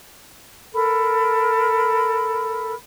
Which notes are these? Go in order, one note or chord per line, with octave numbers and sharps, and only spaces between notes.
A4 A#4 B5